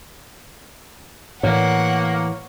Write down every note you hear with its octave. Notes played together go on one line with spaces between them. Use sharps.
A2 E3 A#3 C#5 F#5